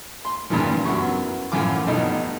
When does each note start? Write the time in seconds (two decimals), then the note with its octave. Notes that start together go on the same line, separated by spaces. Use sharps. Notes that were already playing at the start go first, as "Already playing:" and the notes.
0.25 C6
0.50 G2 A#2 C#3 E3 F3
0.85 F#2 F#3 B3 E4 C#6
1.52 F#2 A2 E3 F3 F4 D6
1.87 G2 B2 F3 F#3 A3 D#4